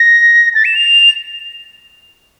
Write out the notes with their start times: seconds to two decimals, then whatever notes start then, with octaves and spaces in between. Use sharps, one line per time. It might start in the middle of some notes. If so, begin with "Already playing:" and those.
Already playing: A#6
0.55 A6
0.65 E7
0.75 F7